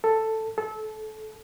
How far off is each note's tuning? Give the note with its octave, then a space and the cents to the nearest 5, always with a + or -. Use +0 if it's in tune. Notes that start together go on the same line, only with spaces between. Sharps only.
A4 +5
A4 -25